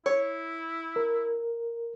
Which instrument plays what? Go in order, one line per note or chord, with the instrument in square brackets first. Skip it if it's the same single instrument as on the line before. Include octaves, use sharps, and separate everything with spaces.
[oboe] E4 [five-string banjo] C#5
[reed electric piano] A#4